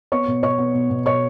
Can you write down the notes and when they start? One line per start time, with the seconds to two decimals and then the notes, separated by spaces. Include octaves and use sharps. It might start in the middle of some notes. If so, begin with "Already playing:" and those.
0.12 B3 C#5 C#6
0.28 B2
0.43 B2 C#5 C#6
0.58 B3
0.74 B2
0.90 B2
1.06 B2 C#5 C#6